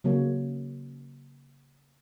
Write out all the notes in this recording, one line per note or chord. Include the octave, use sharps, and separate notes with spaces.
C#3 F#3 A#3 C#5